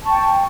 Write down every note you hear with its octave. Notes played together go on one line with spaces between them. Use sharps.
G5 A5 C#6